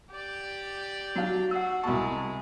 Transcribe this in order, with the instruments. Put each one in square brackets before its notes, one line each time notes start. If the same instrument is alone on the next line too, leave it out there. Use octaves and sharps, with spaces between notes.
[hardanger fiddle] G4 D5
[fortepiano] F#3 F5 [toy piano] D#4 F#4
[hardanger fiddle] F#4 [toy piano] F#5 E6
[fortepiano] C2 B2 A5 [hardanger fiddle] G#3 [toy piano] C#6